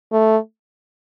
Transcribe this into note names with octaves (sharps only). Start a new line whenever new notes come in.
A3